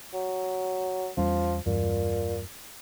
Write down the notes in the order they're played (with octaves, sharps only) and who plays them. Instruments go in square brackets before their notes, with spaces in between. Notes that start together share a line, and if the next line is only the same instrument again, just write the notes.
[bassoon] F#3
[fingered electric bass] E2 G3 C#4 [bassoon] F3
[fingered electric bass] E2 G2 [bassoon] A#2